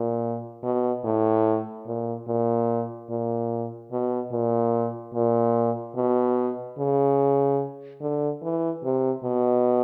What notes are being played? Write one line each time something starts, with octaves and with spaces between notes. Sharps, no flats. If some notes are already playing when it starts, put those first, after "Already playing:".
Already playing: A#2
B2
A2
A#2
A#2
A#2
B2
A#2
A#2
B2
C#3
D3
E3
C3
B2